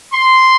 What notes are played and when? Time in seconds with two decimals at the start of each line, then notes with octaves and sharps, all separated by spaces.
0.13 C6